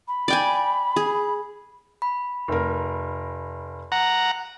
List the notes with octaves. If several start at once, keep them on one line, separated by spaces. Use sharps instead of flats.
B5
D5 G5 G#5
G#4
B5
F1 A#4
F#5 A#5